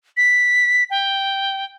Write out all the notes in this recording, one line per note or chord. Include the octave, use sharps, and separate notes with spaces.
B6
G5